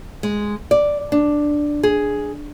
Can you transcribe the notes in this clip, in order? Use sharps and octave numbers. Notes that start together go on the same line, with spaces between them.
G#3
D5
D4
G#4